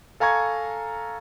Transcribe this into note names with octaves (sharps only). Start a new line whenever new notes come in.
A4 F5 G#5 A#5 C#6 G#6